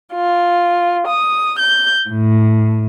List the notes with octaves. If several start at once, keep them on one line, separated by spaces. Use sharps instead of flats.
F4
D#6
G6
A2